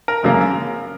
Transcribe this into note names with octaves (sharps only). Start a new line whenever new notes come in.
A#4
G#1 F#2 C#3 A#3